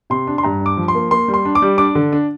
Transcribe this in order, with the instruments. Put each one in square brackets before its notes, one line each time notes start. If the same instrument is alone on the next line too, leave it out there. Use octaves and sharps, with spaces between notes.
[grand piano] C3 C6
D4
C6
G2 A#5
D4 D6
F3
C6
A#3
A#3 C6
G3
C6
D4
D6
G3
D4 D6
D3
D4